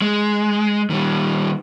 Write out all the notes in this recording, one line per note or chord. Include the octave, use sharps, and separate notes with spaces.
G#3
D#3 G3